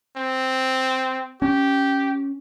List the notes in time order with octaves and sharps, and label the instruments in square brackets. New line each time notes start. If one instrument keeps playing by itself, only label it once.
[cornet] C4
[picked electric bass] C#4 [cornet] G4